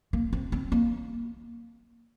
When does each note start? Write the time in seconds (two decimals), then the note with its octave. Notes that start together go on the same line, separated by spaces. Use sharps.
0.13 A#3
0.33 C4
0.52 C4
0.72 A#3